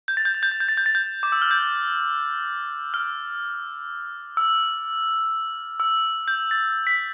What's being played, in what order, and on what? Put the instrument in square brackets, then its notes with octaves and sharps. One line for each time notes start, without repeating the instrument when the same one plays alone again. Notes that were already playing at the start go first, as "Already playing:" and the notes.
[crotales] G6
A6
G6
A6
G6
A6
G6
A6
G6
A6
G6
D6
E6
F6
G6
F6
E6
E6
G6
A6
B6